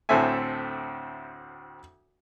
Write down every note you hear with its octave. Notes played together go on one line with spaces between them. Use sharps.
D2 A2 C4 A4 E5 G#5